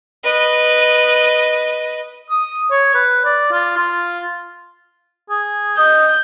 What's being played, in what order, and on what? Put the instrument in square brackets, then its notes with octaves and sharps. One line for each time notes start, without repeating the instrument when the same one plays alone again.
[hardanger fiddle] B4 D#5
[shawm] D#6
C#5
B4
D5
F4
F4
[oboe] G#4
[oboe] D#5 [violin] G6